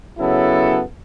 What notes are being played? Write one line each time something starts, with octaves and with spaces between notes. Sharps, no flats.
C#3 F#3 B3 E4 A4